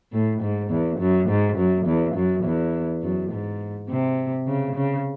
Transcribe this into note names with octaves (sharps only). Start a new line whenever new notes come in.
A2
G#2
E2
F#2
G#2
F#2
E2
F#2
E2
F#2
G#2
C3
C#3
C#3